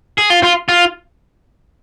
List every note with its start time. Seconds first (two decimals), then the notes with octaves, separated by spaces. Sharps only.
0.18 G#4
0.30 F4
0.43 F4
0.69 F4